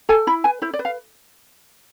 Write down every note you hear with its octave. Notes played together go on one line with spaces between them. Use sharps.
A4 G#5
E4 B5
B4 G#5
E4 C5
D5
B4
F5